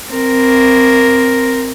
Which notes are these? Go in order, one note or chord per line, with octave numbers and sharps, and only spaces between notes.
C4 A#4